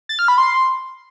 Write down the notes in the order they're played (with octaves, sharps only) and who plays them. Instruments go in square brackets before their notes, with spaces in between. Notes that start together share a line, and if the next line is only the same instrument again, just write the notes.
[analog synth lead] A6
F6
B5
C6